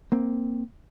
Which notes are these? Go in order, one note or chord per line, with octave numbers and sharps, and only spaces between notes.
A#3 C4